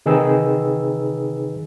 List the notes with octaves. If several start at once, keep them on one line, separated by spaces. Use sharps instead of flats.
C3 D#3 D#4 G#4 B4 E6